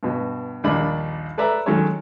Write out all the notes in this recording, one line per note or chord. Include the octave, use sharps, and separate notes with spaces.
G2 B2
A#1 D#2 G3 D4 B5
A4 B4 D5 E5 A#5
D#3 F#3 G#3 C#4 A4 C#5